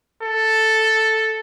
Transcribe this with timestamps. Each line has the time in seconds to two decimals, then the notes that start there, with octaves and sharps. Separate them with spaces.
0.23 A4